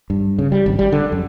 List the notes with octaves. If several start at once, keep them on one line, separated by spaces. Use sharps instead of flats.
G2
C#3
G3
G#1
G3
D3
F#2